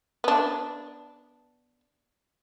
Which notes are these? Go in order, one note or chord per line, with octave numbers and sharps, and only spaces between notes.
B3 D4